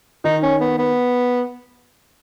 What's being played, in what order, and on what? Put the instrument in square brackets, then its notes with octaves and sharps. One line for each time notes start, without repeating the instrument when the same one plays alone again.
[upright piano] D#3 [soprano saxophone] D#4
[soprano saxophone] C#4
B3
B3